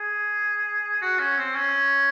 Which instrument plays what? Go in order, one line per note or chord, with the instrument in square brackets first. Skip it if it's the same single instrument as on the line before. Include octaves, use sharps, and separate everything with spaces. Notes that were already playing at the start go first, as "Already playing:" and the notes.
Already playing: [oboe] G#4
F#4
C#4
C4
C#4